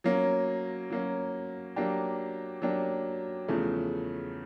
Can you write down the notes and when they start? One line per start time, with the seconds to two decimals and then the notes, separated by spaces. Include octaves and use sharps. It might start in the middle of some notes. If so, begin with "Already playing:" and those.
0.04 F#3 A#3 C#4
0.90 F#3 A#3 C#4
1.76 F#3 A#3 D4 G4
2.62 F#3 A#3 D4 G4
3.48 E2 C#3 F3 A3